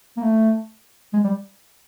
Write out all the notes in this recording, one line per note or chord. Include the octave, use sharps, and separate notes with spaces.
A#3
A3
G#3
G3